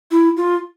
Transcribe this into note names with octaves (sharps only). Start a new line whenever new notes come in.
E4
F4